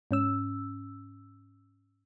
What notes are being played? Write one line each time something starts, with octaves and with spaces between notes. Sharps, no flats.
G#2 C#4 E6